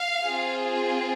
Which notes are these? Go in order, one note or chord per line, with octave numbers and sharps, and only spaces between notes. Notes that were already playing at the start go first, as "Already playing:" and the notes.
Already playing: F5
C4 F4 G#4